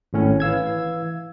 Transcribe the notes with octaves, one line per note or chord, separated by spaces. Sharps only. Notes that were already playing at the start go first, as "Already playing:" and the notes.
G#1 A2 C#4
E3 F5 E6 G#6